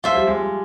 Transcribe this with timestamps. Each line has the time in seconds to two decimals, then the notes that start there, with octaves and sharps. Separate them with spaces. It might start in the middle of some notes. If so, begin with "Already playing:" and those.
0.04 F3 F4 C5 E5
0.15 G3
0.27 G#3